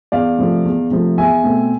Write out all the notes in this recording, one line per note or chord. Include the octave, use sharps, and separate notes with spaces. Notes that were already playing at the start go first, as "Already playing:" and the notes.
E2 D5 F5
C3 F3 A3
E2
C3 F3 A3
E2 E5 G#5
B2 A3 C4